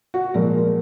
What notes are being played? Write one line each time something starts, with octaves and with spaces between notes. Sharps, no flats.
F#4
A#2 F3 G#3 A#4